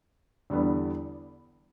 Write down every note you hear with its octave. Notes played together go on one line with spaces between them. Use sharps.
E2 D3 G3 B3